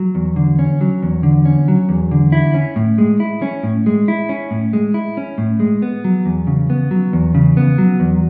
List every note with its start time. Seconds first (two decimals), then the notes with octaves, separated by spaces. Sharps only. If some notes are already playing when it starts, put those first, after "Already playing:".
Already playing: F#3
0.15 E2
0.36 D3
0.59 C#4
0.81 F#3
1.03 E2
1.23 D3
1.46 C#4
1.68 F#3
1.89 E2
2.11 D3
2.32 E4
2.54 C#4
2.76 A2
2.98 G#3
3.20 E4
3.42 C#4
3.63 A2
3.86 G#3
4.08 E4
4.29 C#4
4.51 A2
4.73 G#3
4.94 E4
5.17 C#4
5.38 A2
5.60 G#3
5.82 B3
6.04 F#3
6.26 E2
6.47 C#3
6.70 B3
6.91 F#3
7.13 E2
7.35 C#3
7.57 B3
7.78 F#3
8.00 E2